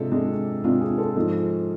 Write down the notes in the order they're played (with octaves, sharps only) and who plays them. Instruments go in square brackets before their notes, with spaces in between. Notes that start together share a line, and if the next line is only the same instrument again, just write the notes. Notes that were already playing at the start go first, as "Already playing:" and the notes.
Already playing: [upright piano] C3 G#3 D4 F4 A4
C3 G#3 D4
C3 G#3 D4 F4
G#4
F4 A4
G#2 F3 G#3